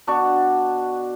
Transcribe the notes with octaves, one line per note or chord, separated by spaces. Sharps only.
B2 D4 F#4 C#6